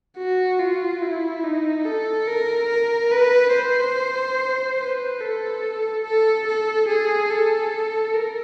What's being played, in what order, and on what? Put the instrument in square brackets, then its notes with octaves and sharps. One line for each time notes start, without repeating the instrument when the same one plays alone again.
[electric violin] F#4
F4
E4
D#4
A4
A#4
A#4
B4
C5
B4
A4
A4
A4
G#4
A4
A#4